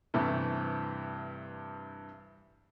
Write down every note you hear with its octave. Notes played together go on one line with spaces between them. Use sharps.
G2 C3 E3 A3